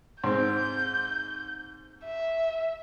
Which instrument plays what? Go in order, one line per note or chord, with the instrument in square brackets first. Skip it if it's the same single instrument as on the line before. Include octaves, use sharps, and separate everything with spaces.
[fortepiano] G#2 C4 [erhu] G6
[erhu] E5